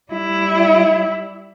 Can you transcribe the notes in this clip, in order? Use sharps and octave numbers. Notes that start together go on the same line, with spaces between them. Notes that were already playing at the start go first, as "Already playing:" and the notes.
G3 E4